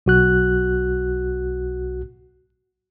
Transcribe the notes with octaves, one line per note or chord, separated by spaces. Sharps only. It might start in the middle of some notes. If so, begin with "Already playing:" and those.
B1 F#4 F#6